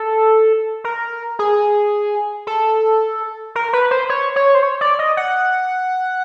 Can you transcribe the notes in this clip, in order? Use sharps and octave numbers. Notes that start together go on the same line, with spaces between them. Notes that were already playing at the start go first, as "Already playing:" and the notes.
Already playing: A4
A#4
G#4
A4
A#4
B4
C5
C#5
C#5
C5
C#5
D5
D#5
F#5